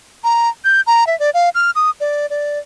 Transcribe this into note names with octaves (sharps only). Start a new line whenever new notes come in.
A#5
G6
A#5
E5
D5
F5
F6
D#6
D5
D5